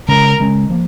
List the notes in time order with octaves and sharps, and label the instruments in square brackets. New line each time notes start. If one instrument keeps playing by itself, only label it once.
[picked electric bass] C#3 G#3 C#4 [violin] A#4
[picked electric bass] C#3 G#3 C#4
F3 A#3